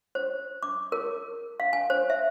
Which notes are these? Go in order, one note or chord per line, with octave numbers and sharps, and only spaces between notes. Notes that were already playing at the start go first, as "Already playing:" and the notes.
C5
D6
A#4
F5
G#5
C5
E5